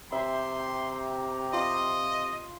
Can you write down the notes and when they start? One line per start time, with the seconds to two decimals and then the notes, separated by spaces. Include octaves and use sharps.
0.12 C3 G4 E5 G5 A#5 C6
1.53 F4 D#5